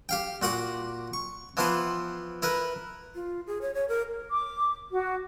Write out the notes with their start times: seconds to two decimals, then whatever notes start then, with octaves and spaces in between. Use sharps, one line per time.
0.09 G4 F5 G5
0.42 A#2 F#4 F#5 D6
1.13 C#6
1.57 E3 F3 B3 E4 C5
2.42 E4 A#4 B4
3.15 F4
3.47 G#4
3.62 C#5
3.74 C#5
3.89 A#4
4.30 D6
4.92 F#4